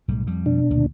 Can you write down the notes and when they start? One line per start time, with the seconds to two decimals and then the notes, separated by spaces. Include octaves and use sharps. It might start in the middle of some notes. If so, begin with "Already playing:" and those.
0.08 B1 A2 G3
0.27 F2 G3
0.46 B2 D4
0.70 D2 A#2 D#3